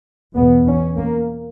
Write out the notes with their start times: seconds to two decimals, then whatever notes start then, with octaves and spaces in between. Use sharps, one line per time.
0.35 E2 B2 B3
0.66 C#4
0.97 A#3